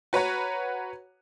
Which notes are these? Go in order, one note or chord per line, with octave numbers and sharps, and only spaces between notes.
F#4 B4 C#5 F#5 A#5